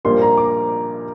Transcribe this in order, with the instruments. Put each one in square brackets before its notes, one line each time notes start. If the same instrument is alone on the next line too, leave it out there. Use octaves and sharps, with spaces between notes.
[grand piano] A#1 A#2 G3 A#3 C6
A#5
D6